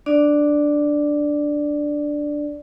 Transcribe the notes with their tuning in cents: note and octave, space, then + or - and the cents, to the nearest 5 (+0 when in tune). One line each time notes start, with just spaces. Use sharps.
D4 +0 D5 +5